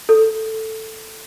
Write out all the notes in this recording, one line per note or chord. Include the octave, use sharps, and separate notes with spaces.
A4